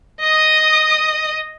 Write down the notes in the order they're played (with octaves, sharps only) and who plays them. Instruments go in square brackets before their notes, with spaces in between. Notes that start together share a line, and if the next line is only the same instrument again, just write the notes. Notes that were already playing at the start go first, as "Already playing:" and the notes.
[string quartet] D#5 D#6